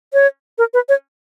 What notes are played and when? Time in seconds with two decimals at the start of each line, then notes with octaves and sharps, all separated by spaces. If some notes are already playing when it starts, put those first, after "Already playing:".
0.13 C#5
0.58 A#4
0.74 B4
0.89 C#5